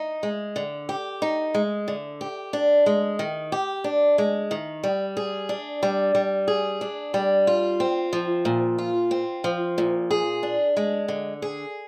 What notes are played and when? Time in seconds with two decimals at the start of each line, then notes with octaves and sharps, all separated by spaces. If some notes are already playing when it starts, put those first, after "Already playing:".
Already playing: D#4
0.23 G#3
0.56 D3
0.89 G4
1.22 D#4
1.54 G#3
1.88 D3
2.21 G4
2.53 D4
2.86 G#3
3.19 D#3
3.52 G4
3.84 D4
4.18 G#3
4.51 D#3
4.84 G3
5.17 G#4
5.49 D4
5.83 G3
6.15 G3
6.48 G#4
6.81 D4
7.14 G3
7.47 F4
7.80 C4
8.13 F3
8.45 A#2
8.78 F4
9.11 C4
9.44 F3
9.78 A#2
10.11 G#4
10.43 D4
10.77 G#3
11.08 D3
11.42 G#4